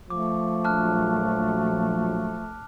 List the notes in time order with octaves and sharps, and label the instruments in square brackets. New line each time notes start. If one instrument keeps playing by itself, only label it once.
[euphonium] F3 [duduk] A3 [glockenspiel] D6
[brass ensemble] A#1 F#3 [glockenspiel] A5 F6 F#6